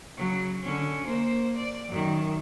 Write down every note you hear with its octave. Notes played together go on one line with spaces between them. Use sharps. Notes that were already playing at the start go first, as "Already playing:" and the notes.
C#3 F#3
D3 C#4
A#3 C5
D5
F#2 D#3